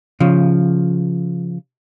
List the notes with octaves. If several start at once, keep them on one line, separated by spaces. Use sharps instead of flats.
C#3 F3